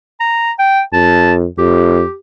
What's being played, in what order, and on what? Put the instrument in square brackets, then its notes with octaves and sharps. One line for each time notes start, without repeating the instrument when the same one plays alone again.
[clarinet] A#5
G5
[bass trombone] F2 [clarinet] A5
[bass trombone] F2 [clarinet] G4